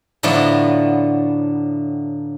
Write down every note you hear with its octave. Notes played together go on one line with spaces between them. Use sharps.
A2 D3 F3 F#3 A3 B3